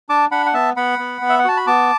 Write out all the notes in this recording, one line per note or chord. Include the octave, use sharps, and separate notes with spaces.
D4 A5 D6
D4 F#5 B5
F#5
B3 E5 A5
B3 F#5 B5
B3
B3
E5
F#5
F#4 A5
B5
B3 A5 D6